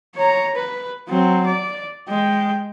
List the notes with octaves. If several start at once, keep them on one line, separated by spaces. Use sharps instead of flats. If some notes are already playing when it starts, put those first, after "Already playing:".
C#5 A#5
B4
F#3 C4
D5
G#3 G5